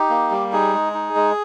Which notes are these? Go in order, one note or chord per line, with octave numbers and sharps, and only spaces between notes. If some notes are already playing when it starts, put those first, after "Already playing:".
Already playing: D#4 G4
A#3
G3
D#4 G#4
G#3
D#4
G#3